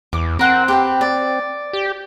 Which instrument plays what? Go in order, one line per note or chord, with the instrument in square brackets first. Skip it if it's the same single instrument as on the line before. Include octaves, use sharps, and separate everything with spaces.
[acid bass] E2 [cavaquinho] D6
[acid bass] C4 [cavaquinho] A#4 F#5 C6
[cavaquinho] G4 B4 G5
D5
[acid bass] G4